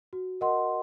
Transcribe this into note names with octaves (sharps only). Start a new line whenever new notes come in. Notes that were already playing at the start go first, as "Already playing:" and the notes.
F#4
A#4 D#5 F#5 C6